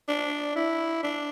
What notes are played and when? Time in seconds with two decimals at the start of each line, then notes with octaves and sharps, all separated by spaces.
0.09 D4
0.56 E4
1.03 D4